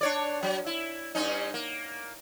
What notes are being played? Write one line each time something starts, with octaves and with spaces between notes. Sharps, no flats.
D4 C#5 D5
F#3
E4
G2 C#4 D#4
A#3